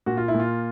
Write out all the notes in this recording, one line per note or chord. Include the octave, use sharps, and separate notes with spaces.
A#2 F#4
F4
E4
A#2
F4